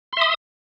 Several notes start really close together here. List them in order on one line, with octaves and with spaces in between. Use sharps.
C6 E5 D#6